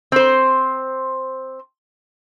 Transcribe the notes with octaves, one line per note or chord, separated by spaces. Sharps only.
C4 C5